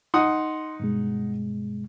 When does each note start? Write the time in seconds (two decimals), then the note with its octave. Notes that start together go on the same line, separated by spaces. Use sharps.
0.14 D#4 F#5 C6 D#6
0.80 G2 B2 G#3